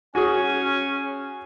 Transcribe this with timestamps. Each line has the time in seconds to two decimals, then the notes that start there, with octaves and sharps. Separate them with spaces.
0.15 C#4 F#4 G#4 G#5